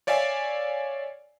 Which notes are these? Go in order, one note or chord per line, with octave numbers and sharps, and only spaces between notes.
C#5 D5 E5 F5 G#5